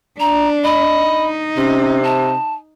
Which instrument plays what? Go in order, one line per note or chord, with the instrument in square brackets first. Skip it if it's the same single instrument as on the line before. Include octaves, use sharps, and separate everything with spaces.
[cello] D4 [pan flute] A#5
[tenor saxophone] D#5 [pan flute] B5
[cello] D#4
[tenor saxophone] C3 [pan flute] C#4
[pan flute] A5